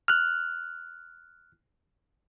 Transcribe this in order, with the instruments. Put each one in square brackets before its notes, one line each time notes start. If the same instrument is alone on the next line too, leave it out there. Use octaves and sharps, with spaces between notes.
[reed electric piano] F6 F#6